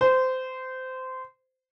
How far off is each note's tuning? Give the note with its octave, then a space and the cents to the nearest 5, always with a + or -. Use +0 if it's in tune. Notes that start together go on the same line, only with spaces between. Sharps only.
C5 -20